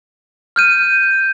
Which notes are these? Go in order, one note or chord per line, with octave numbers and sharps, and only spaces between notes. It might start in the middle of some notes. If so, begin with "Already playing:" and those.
F6 G6 D#7